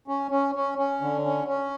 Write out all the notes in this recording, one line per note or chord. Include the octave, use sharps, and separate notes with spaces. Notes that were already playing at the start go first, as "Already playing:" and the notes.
C#4
C#4
C#4
C#4
D3
C#4
C#4